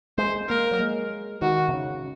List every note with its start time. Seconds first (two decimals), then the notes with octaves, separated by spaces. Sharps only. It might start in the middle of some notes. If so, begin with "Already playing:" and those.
0.18 G#3 C5
0.49 A#3 A#4
0.71 F#3
0.80 G#3
1.42 D#3 F#4
1.69 C3
1.73 C#3